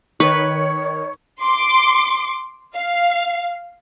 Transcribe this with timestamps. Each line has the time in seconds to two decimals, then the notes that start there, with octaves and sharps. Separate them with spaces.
0.20 D#3 B4 C#5 C#6
1.42 C6 D6
2.76 F5